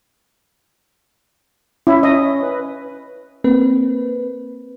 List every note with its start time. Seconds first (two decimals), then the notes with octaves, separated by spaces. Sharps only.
1.87 C#4 E4
2.03 D#5
2.43 B4
3.44 A#3 C4 B4